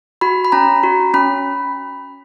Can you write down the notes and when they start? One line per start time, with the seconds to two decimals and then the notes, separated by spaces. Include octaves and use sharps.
0.21 F#4 B5
0.45 B5
0.52 C#4 A#5
0.83 F#4
1.14 C#4 B5